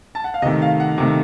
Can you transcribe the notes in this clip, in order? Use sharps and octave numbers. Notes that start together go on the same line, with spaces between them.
A5
F#5
F5
C3 D#3 A3 D#5
F5
F#5
C3 D#3 A3